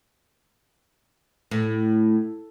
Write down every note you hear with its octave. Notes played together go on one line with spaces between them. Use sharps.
A2